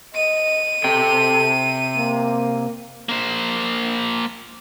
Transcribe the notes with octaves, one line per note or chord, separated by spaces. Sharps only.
D#5 D#7
C3 A4 G5
A#3
A#3 C5